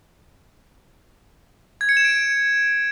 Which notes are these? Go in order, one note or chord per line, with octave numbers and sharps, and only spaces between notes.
G#6
C#7
E7
D7